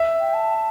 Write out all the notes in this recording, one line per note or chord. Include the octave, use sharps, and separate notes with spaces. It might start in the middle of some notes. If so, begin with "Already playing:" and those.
Already playing: E5
G5
A5